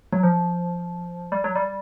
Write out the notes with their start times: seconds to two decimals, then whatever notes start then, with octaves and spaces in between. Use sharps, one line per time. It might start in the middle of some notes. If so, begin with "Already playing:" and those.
0.13 F#3
0.23 F3
1.32 G3
1.44 F#3
1.55 G3